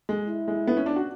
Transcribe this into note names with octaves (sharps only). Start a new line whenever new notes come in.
G#3
E4
G#3
B3
C#4
D4
F#4